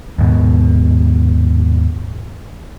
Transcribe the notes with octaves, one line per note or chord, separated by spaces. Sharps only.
D#2 G#2 B2